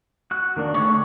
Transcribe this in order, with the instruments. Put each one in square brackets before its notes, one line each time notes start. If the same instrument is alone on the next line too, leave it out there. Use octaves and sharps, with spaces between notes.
[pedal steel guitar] F#4 F#6
D#3 A#3 D4
[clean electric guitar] D2 G4 C#5 [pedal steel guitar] A3